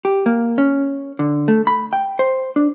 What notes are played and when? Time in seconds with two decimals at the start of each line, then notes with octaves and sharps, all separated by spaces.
0.05 G4
0.26 A#3
0.58 C#4
1.19 D3
1.48 A3
1.67 B5
1.93 G5
2.19 C5
2.56 D4